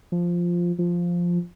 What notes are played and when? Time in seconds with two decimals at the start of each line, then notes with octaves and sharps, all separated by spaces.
0.12 F3
0.79 F3